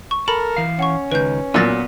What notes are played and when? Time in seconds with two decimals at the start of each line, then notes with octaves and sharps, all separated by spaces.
0.11 C#6
0.28 A4 A#4 B5
0.56 E3 F5
0.79 C#4 F#5 C#6
1.12 C#2 D#3 B4 G6
1.54 A#2 F#3 B3 E6 A6 A#6